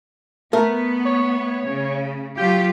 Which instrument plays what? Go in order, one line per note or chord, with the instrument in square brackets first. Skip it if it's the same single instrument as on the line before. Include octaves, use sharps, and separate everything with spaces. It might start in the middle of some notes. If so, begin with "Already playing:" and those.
[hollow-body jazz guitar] A3 A#4 [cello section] B3
[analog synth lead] C#5
[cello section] C#3
[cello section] F#3 F4 G4 [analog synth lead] G5